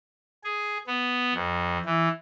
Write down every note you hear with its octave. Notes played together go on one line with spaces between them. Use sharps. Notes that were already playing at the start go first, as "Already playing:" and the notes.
G#4
B3
F2
E3